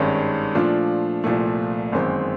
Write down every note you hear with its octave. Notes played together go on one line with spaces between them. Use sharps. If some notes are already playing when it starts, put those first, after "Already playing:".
Already playing: G#1 G2 D#3 G#3 C#4
A#2 F3 A3 D4 F4
C2 A#2 F3 A3
G1 F#2 D#3 G#3 C4